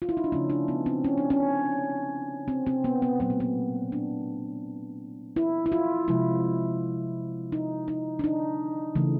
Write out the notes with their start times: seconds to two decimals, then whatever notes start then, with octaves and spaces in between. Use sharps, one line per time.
0.02 F4
0.09 E4
0.17 D#4
0.24 D4
0.32 C#3 F3 A3 C#4
0.50 D4
0.68 B3
0.86 C4
1.04 C#4
1.18 D4
1.30 C#4
2.48 C4
2.67 C4
2.84 B3
3.02 B3
3.20 A#2 F#3 A3 B3
3.30 A#3
3.40 B3
3.92 D4
5.36 E4
5.66 E4
5.72 F4
6.08 C3 F3 G#3 E4
7.52 D#4
7.88 D#4
8.19 D4
8.24 D#4
8.95 C#3 E3 A3